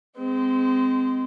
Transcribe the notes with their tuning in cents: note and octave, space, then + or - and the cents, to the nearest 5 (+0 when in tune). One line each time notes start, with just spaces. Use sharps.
G#3 +0 C4 -25